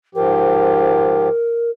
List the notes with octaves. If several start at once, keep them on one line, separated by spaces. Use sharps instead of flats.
G#2 F3 G4 A#4